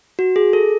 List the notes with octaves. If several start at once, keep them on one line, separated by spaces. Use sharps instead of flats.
F#4
G#4
A4